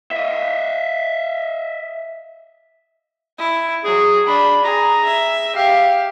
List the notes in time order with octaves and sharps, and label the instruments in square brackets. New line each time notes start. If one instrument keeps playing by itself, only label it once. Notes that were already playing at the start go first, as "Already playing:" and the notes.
[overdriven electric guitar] D#5 E5
[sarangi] E4
[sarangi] F#3 [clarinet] G#4
[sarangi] D4 [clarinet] B5
[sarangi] G#4 [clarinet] A#5
[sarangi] E5
[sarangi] G4 [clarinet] F5